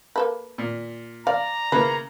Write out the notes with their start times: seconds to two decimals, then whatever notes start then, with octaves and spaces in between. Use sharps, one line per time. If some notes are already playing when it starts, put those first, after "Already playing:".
0.16 A#3 A4 B4
0.58 A#2
1.27 D5 F5 A#5
1.72 C#3 A#3 E4 B4